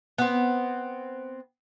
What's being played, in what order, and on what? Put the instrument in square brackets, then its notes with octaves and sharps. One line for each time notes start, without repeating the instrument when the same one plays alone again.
[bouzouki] B3 C4